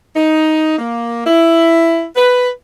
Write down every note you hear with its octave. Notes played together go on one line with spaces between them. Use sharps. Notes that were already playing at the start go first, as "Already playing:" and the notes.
D#4
A#3
E4
B4